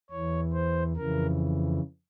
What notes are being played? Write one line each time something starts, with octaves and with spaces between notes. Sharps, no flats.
E2 E3 C#5
C5
F2 C#3 E3 A#4